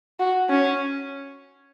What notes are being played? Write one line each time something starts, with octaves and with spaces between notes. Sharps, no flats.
F#4
C#4